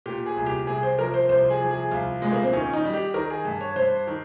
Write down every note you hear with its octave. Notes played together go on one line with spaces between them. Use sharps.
A#2 G4
G#4
C2
G4
C2 G#4
C5
F3 A#4
C5
C2 C5
G#4
F3
G#4
C2 F4
A#2 G#3
A#3
C4
D#3 C#4
D#4
G3
G4
D#3 A#4
G#4
G2
C#5
G2 C5
D#3